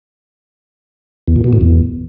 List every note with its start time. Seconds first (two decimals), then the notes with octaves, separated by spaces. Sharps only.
1.28 E2
1.36 A#2
1.44 B2
1.53 A2
1.61 E2